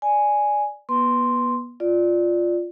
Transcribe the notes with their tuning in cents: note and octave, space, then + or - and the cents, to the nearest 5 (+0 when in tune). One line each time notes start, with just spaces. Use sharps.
D5 +0 G#5 +0
B3 -35 B4 +0 C6 +0
F4 +0 D5 +5